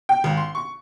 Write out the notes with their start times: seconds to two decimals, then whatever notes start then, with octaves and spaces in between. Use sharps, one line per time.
0.09 G5
0.24 G#1
0.37 C6
0.55 C#6